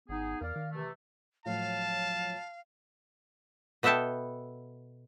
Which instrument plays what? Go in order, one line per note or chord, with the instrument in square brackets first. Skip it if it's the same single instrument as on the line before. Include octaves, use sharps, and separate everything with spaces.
[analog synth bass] G#1 [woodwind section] B3 D#4 G#4
[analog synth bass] E2 [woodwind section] A#4 D5 F5
[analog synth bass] D#3
[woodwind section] C3 E3 A3
[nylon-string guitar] A2 F3 F#3 [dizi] F5 [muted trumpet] A5
[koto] B2 B3 A4 E5 G5 A5